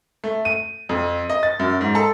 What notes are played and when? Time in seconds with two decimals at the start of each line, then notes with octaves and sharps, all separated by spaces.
0.24 A3
0.45 D#7
0.89 F2
1.30 D#5
1.43 A6
1.59 F#2
1.81 G#2
1.95 A4